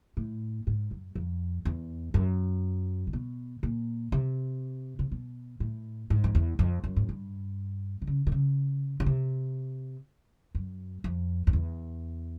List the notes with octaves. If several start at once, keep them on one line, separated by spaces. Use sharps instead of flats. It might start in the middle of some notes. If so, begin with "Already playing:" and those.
A2
G#2
F#2
F2
E2
F#2
C3
B2
A#2
C3
C3
B2
A2
G#2
F2
E2
F2
F#2
G#2
G2
C3
C#3
D3
C#3
C#3
C3
F#2
F2
F2
E2